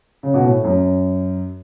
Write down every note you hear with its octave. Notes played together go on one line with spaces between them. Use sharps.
C#3
B2
A2
F#2